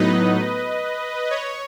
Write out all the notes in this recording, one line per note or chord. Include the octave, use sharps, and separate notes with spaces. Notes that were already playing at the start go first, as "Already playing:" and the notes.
Already playing: A2 F#3 B3 D#4 B4 D#5
C#5